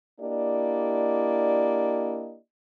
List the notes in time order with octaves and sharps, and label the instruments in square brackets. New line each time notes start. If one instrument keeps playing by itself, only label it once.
[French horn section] A#3 D4 E4 G4 D5 D#5